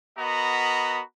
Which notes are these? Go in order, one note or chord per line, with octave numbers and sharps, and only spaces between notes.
B3 F#4 A#4 D#5 A#5 B5